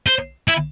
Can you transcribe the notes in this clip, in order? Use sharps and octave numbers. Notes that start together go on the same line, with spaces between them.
C5
E4